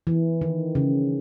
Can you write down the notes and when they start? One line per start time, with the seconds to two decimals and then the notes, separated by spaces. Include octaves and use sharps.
0.07 E3
0.42 D#3
0.75 C#3